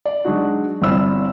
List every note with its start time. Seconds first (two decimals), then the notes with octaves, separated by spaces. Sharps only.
0.05 D5
0.25 F#3 G#3 D4 D#4 F#4
0.82 G1 G2 C4 E4 B5 E6